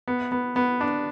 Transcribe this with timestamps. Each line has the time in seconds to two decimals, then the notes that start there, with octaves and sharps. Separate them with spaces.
0.08 B3
0.32 B3
0.56 B3
0.81 D4